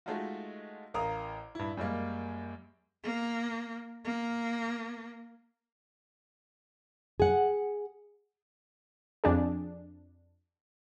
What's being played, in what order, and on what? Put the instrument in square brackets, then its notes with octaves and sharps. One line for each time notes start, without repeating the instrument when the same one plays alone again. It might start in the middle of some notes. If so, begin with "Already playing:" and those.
[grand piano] G#3 A3 D#4 F4 F#4
A1 A#4 F5 A#5 D#6
G2 E4
F#2 G3 G#3 A#3
[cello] A#3
A#3
[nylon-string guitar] G#4 F#5
[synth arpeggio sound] F2 D4 G#4